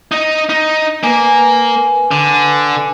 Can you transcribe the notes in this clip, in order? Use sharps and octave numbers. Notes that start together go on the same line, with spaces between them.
D#4 D#5
D#4
A#3 B4 G#5
D3